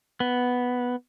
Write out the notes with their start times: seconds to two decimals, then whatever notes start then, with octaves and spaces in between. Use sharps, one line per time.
0.20 B3